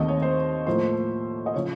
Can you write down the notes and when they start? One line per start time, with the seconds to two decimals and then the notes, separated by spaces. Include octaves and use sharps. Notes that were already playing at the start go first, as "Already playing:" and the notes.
Already playing: D#2 D#3 A3 C4 D#5
0.08 C#5
0.22 C5
0.67 A2 F3 A#3 C5
1.46 D#5
1.54 C#3 F3 C#5